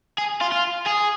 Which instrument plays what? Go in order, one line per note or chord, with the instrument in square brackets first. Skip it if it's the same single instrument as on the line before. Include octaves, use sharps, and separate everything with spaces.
[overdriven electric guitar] G#4
F4
F4
G#4